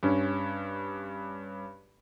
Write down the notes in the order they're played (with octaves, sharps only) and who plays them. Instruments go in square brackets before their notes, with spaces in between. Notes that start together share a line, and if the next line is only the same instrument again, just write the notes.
[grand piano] G2 C#4